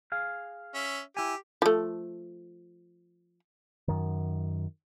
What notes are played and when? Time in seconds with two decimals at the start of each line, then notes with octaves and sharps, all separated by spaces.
0.12 G#4 F5
0.74 C#4 E5
1.17 E4 G4 G#5
1.62 F3 A3
3.88 F#2 D#3